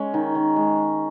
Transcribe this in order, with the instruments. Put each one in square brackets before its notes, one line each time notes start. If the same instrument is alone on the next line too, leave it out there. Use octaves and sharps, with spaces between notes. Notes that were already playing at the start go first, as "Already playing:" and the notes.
Already playing: [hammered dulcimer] G#3 C#4
D#3
D#3
G#3